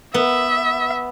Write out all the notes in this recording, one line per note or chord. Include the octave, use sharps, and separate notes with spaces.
B3 E5